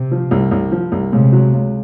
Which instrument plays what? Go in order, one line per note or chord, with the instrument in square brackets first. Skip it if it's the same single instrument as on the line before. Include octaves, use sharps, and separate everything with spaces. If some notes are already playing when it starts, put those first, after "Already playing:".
Already playing: [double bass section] C3
[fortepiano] F3
C2
C2
F3
C2
[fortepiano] C#2 [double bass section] C3
[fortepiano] F#3
C#2